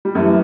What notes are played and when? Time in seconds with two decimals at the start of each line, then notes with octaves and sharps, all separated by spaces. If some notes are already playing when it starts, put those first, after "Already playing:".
0.05 G3
0.15 F#2 E3 A3